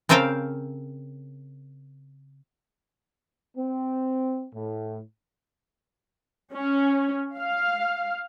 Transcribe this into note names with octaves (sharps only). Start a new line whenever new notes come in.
C#3 C4 A4 A#4 F5 G5
C4
A2
C#4
F5